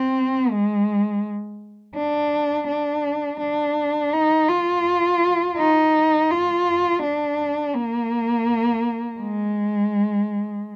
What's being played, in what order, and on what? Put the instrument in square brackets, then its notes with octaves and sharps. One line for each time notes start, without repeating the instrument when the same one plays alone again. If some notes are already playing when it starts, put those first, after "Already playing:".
Already playing: [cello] C4
G#3
D4
D4
D4
D#4
F4
D#4
F4
D4
A#3
G#3